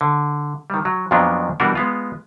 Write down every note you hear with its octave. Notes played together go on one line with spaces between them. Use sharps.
D3
D#3 G3
F#3
F2 A#2 F3 F#3 B3 D4
B2 E3 G3 D4 F#4 A#4
G#3 B3 F4